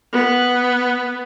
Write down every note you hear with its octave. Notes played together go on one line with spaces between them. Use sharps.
B3